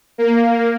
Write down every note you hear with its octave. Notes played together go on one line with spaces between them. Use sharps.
A#3